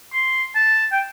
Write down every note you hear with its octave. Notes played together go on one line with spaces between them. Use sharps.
C6
A5
G5